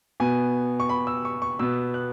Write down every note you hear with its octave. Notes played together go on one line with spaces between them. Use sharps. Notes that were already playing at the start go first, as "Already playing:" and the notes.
B2 B3 G#5
C#6
B5
E6
C#6
C#6
B2 B3 E6
F#6